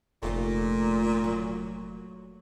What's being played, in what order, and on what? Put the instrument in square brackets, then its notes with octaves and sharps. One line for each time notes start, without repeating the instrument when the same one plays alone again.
[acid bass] F1 [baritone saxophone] A#2 [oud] A3 D#4 F4
[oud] F#3